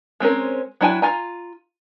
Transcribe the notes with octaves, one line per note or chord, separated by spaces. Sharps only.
G#3 C4 C#4 A#4
F#3 D4 E4 G5 G#5
F4 G#5 A#5